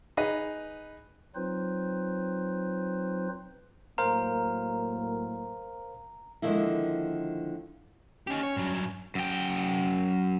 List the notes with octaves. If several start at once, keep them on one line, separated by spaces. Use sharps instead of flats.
D#4 G#4 B4 D#5
F#3 C4 D#4 F4 B4 C5
A2 F#3 A#3 A#4 C5 F5 A#5
D3 D#3 F3 G#3 A#3 E4
C#4 D#4 G4
C#5
G2 F#3
F#2 G5